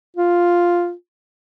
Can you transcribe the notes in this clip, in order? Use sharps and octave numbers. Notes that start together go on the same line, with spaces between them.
F4